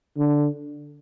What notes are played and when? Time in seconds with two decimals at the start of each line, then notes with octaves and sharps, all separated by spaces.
0.17 D3